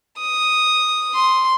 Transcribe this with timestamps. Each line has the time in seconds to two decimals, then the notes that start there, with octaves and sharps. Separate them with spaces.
0.20 D#6
1.15 C6